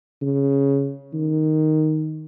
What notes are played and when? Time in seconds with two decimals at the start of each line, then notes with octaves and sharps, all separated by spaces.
0.22 C#3
1.14 D#3